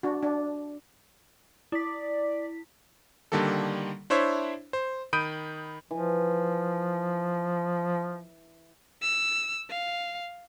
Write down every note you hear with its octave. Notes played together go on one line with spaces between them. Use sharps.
D4 F#4
D4
E4 D5 B6
D3 D#3 G3 A#3 A4
D4 E4 C5 C#5 E5
C5
D#3 B5 D#6 G6 D7 D#7
E3 F3
E6
F5